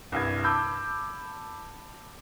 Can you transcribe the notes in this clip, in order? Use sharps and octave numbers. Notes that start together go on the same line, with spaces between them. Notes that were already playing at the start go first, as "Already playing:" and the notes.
C2 G2 G#6
A5 B5 D6 E6 G6